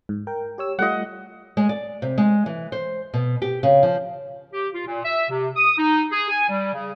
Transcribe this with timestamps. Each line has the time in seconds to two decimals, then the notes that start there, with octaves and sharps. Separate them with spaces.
0.09 G#2
0.27 A#4 G5
0.58 G4 C#5 E6
0.79 G3 A3 F4 D#5 F#5
1.57 G#3
1.69 D5
2.02 C3
2.18 G#3
2.46 E3
2.72 C5
3.14 B2
3.42 G4
3.63 C#3
3.83 F3
4.53 G4
4.74 F4
4.87 A#2
5.05 E5
5.30 C3
5.55 D#6
5.78 D#4
6.11 G#4
6.29 G#5
6.49 G3
6.74 C#3